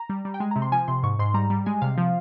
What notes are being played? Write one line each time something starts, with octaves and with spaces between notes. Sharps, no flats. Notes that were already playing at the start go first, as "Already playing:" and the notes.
Already playing: A#5
G3
G3
G5
G#3 G#5
A#5
C3
C6
F3 G#5
C3 C6
G#2 C#6
G#2 C6
G3 A#5
G3
G#3 G#5
C3 F5
F3